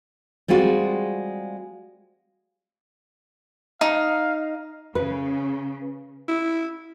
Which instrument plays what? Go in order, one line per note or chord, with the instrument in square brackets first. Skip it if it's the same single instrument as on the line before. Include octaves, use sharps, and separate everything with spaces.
[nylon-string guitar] G3 G#3 C4 F4 F#4
[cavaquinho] D#4 [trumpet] F5
[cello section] C#3 [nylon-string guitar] B4
[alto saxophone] E4